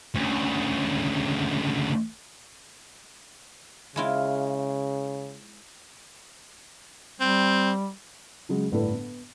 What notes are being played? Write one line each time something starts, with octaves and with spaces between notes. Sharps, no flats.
D2 C#3
C#3 G#3 E4 F4
G3 C4
C#3 F#3 G#3
G1 A2 D3 B4
B3